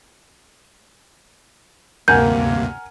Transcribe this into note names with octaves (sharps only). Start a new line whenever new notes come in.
D2 G2 C3 A#3 A#4 F#5 G#5 G6